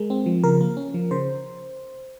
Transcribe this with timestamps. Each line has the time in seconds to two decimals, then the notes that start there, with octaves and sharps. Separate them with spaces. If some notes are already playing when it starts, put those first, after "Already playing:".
Already playing: G#3 A#4
0.10 C4
0.26 F3
0.44 C#3 A#4
0.61 A#3
0.77 C#4
0.94 F3
1.11 C#3 C5